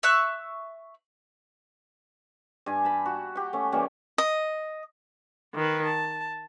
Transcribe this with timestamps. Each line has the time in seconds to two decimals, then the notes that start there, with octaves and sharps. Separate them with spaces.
0.03 E5 C#6 E6 F#6
2.66 G2 G#5
2.85 A5 B5
3.06 F#4
3.35 G4 F#5
3.53 A3 C#4
3.72 E3 G3 A#3 C#4
4.18 D#5
5.55 D#3 B4
5.85 A5